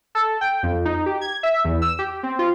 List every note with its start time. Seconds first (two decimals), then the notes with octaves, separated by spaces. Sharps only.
0.15 A4
0.41 G5
0.63 F2
0.85 D#4
1.06 G4
1.21 G#6
1.43 E5
1.65 E2
1.82 E6
1.99 G4
2.23 C4
2.39 F4